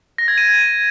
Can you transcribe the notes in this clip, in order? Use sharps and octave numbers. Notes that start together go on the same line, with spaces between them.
A#6
G#6
D#7